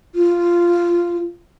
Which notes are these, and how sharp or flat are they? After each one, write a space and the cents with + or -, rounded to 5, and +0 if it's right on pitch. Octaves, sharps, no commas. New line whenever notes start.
F4 -10